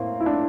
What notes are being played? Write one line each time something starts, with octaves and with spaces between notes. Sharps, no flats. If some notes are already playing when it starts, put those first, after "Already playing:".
Already playing: A2 A3 A#3 C4
E4
D4